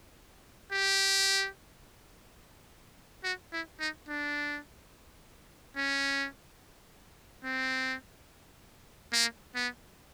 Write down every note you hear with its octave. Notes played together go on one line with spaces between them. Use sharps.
G4
F#4
E4
D#4
D4
C#4
C4
A#3
B3